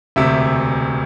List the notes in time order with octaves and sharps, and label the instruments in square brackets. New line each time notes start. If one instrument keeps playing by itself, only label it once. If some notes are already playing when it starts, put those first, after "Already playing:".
[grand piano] E1 D2 C3 E5